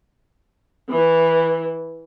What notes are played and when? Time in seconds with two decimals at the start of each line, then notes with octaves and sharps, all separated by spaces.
0.91 E3